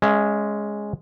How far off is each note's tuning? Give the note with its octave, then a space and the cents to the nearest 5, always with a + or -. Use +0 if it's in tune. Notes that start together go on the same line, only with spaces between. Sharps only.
G#3 +0 C#4 +0 E5 +45